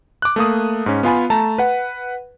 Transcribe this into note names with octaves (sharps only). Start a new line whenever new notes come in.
D6 F#6
A3 A#3 D#6
G#2 C#4
B3 F4 G#5 B5
A3 A5 A#5
B4 F#5